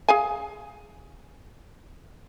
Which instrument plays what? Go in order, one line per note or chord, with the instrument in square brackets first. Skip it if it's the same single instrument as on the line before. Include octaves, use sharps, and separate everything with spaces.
[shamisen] G#4 F5 G#5